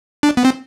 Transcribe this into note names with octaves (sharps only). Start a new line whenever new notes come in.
D4
B3
C4